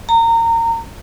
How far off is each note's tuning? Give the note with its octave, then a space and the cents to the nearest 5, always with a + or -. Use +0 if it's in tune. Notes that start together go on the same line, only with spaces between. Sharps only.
A#5 -25